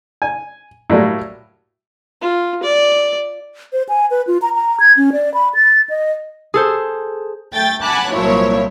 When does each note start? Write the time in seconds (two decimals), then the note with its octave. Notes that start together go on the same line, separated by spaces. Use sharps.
0.22 G#5
0.90 A2 F#3 G3 A#3
2.22 F4
2.63 D5
3.73 C5
3.89 G#5
4.10 B4
4.27 F4
4.42 A#5
4.54 A#5
4.80 G#6
4.97 C#4
5.13 D5
5.34 B5
5.55 A6
5.89 D#5
6.54 G#4 A4 C5
7.53 A3 G5 A6
7.82 F#5 G#5 A5 B5 D6 F#6
8.12 C2 A#2 F3 F#3 E4 C#5